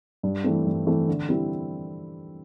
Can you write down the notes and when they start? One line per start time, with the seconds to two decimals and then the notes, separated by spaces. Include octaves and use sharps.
0.23 G2
0.44 E3 A3 C4
0.66 G2
0.87 E3 A3 C4
1.08 D3
1.29 G3 C4 E4